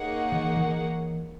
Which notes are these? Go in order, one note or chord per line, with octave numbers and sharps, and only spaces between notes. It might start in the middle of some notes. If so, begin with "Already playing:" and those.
Already playing: A#3 D#4 G#4 C#5 F#5
E3
E3